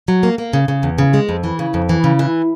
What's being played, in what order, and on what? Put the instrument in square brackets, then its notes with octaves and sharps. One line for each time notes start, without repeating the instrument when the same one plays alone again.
[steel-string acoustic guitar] F#3
A#3
A#3
C#3
C#3
E2
C#3
G#3
F2
E3
C#3
F2
E3
C#3
E3